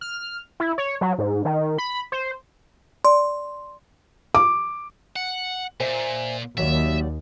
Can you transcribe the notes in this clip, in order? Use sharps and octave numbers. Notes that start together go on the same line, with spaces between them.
F6
E4
C#5
F#3
G#2
D#3
B5
C5
D5 C6
D6
F#5
A#2 C5 E5 G#5
D#2 F#3 D5 E5